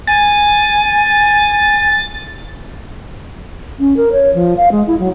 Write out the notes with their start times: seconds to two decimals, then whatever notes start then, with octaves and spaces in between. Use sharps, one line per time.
0.07 G#5 A6
3.79 C#4
3.97 A#4
4.12 C#5
4.34 F3
4.57 F5
4.71 G#3
4.87 E4
4.99 F#3